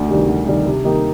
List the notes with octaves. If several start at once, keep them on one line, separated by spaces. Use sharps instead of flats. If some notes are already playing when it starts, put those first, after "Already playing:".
Already playing: D2
C3 D#3 G3
D2
C3 D#3 G3
C3
D#3 A#3 D#4 G4